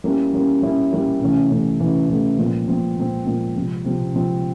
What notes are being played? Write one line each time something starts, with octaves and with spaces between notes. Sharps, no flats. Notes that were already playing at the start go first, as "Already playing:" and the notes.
G3 A#3 C#4 E4
G3 A#3 C#4 E4
G3 A#3 C#4 E4
G3 A#3 C#4 E4
C3 E3 A3 C#4
C3 E3 A3 C#4
C3 E3 A3 C#4
C3 E3 A3 C#4
A#2 F3 G#3 C4
A#2 F3 G#3 C4
A#2 F3 G#3 C4
A#2 F3 G#3 C4
C3 F3 G#3 C4
C3 F3 G#3 C4
C3 F3 G#3 C4